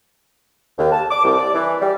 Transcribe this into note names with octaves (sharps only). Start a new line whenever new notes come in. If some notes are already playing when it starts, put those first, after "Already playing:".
D#2
A5
D6
C2
D5
E3
G3